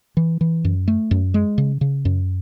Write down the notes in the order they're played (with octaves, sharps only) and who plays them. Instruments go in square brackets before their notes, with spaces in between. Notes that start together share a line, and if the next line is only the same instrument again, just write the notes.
[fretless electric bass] E3
E3
F#2
A3
F#2
G#3
C#3
C#3
F#2